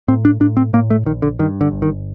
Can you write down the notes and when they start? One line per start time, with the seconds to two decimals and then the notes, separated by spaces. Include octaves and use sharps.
0.08 A2 C4
0.25 D4
0.40 A2 D4
0.57 C4
0.73 A2 A#3
0.90 A3
1.05 A#1 D#3
1.22 D3
1.39 G2 D#3
1.61 D3
1.72 G1
1.82 D#3